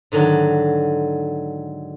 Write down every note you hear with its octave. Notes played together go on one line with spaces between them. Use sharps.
G#2 D3 D#3 F#3